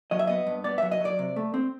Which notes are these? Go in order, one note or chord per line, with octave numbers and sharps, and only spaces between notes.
F#3 D#5
E5
B3 D#5
G2
B3 D5
E5
F#3
D#5
F#3
D5
C3
A3
C4